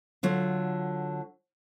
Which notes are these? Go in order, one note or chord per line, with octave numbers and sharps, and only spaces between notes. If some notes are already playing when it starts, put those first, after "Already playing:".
D3 F#3 F4